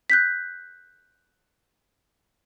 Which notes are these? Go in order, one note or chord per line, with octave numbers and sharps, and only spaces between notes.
F#6 G6 B6